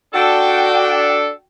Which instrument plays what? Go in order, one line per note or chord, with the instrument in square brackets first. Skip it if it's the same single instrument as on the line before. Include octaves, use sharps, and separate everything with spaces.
[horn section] D4 A4 [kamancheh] F#4 G5